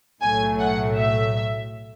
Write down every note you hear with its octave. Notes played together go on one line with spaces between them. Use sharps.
B1 A2 F#3 A3 G#5
F#5
E5